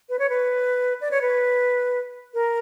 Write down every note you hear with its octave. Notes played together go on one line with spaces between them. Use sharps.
B4
C#5
B4
D5
C#5
B4
A#4